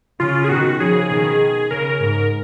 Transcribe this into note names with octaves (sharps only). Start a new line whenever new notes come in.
C#3 F4
G#4
B2 D#3 F#4
C#3 F3 G#4
B2 D#3 G#4
C#3 A#4
G#2